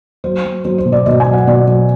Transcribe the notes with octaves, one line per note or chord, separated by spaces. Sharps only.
F#3 C5
F#3
F#3 C5
C5
B2
D5
B2 D#5
G#5
F#3
F#5
B2 D5
F#3